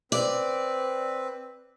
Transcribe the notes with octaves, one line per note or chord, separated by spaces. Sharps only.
C4 B4 D5